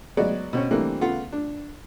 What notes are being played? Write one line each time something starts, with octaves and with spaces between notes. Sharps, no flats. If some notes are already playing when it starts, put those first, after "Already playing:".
F#3 G#3 B3 F#4 D5 D#5
B2 C4 C#4
E3 G3 A3 A#3 C4 D4
C#3 A3 B3 F4 F#5
D4